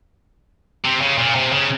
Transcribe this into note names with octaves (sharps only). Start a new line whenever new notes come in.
C3
C#3
A#2
C3
C#3